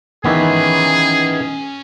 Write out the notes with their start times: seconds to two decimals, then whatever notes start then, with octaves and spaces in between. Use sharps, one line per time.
0.25 D#3 E3 B3 C#4 G#4 E5